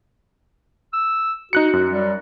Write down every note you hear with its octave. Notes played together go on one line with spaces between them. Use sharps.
E6
D#4 F#4 F#6 C#7
F#2
G3